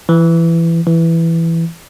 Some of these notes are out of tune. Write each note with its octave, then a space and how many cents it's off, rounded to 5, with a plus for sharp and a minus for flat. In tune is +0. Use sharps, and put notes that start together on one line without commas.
E3 +15
E3 +5